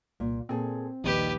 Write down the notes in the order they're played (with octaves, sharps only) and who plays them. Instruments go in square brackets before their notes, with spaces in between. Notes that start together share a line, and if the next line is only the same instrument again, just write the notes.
[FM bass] C2 [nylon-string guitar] A#2
[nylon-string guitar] A#2 G#4 A4 [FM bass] C4
[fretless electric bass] A#1 D#2 [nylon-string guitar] D#3 G3 [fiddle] G4 B4